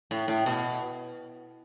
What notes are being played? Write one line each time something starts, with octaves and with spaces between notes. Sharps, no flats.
A2
A2
B2